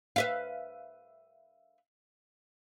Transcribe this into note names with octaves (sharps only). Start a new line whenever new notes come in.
B4 E5 F5